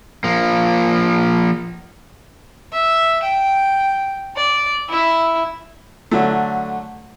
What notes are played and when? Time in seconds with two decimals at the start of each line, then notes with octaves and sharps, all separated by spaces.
0.24 F3 A#3
2.73 E5
3.23 G5
4.36 D5
4.90 E4 E5
6.11 D3 F#3 A3